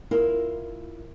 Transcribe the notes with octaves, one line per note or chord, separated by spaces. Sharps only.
E4 F4 A#4